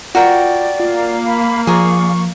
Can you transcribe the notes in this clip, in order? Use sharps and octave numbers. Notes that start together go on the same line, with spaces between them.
F4 F#4 A#4 D5 G5
A#3 F4 F5
B5
F3 G#4 A#4 D5 C#6